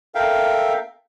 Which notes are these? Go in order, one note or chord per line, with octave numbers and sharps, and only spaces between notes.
A4 A#4 E5 F5 G5